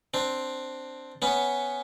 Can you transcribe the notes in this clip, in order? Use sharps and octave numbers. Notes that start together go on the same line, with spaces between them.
C4 D4
B3 C#4